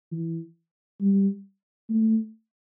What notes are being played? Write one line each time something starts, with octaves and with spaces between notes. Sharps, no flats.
E3
G3
A3